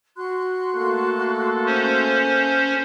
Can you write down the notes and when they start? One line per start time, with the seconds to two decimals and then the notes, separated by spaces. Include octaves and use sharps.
0.16 F#4 C6 F#6
0.74 A3 A#3 A4
1.66 C#4 C5